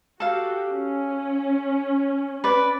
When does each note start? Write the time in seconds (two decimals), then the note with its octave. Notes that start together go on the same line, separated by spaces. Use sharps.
0.20 F#4 G4 A4 F5
0.71 C#4
2.44 B4 D5